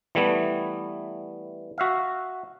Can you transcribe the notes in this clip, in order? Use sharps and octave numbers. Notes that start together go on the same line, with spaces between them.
E3 G3 A3 B3
F#4 E5 F5